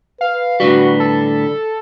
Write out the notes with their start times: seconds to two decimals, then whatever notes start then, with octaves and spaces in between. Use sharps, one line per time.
0.21 B4 F5
0.60 A2 D3 G3 F#4
1.00 A4